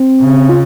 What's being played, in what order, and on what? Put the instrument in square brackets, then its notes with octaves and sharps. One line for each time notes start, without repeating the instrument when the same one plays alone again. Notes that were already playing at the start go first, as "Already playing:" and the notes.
Already playing: [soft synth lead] C4
[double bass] C#3
[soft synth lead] F4